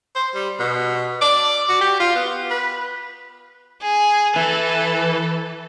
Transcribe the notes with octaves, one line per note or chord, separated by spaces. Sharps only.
C5
G3
B2
D5
F#4
G4
F4
B3
B4
G#4
E3 A4